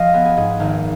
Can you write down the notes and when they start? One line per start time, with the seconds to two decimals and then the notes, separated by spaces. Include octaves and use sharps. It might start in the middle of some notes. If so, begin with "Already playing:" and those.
Already playing: F3 D#5 F5
0.14 B3 G#4
0.25 G#4
0.37 G#2 G#4
0.60 G#1